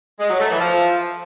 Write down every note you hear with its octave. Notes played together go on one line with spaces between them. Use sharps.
G#3
F#3
A3
E3
F3